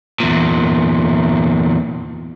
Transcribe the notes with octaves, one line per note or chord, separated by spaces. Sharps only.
E2 A#2